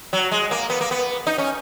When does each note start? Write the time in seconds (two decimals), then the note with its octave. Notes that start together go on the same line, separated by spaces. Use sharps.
0.13 F#3
0.31 G#3
0.51 A#3
0.70 B3
0.81 A#3
0.91 B3
1.27 D#4
1.38 C#4